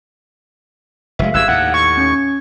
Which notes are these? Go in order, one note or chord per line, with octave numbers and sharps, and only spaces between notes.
F1 G#3 E5 F5
F#1 G2 E6 F#6 G#6
D#2 A2 F#5
C#6 G#6
C#4 G#6